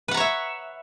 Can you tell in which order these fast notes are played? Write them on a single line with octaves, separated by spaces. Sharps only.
B4 F#5 A#5 C#5 E5